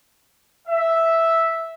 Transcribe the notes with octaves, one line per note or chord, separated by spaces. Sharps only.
E5